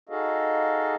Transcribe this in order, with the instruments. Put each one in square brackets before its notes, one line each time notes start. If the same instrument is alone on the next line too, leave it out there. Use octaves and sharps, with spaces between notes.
[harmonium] D#4 F#4 G#4 A4 D#5 F5